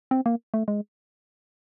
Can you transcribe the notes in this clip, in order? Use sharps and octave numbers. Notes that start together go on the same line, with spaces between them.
C4
A#3
A3
G#3